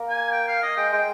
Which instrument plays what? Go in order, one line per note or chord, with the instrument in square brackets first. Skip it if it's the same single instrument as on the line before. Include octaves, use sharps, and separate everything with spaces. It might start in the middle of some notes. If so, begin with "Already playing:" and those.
Already playing: [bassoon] A#3
[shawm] G#5
G5
F5
D#5
[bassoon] G#3 [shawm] G5
[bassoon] G#3 [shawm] G5